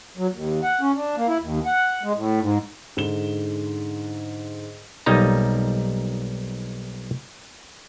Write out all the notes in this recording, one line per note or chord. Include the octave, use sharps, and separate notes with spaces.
F#3
D#2
F#5
C#4
D4
A#3
E4
D#2
F#5
G#3
A2
G#2
G#2 D3 E7 G7
B1 G3 A#3 D#4 D#5 A#5